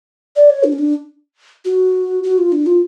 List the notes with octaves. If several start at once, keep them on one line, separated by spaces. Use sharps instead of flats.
D5
C#5
D4
C#4
D4
F#4
F#4
F4
D4
F4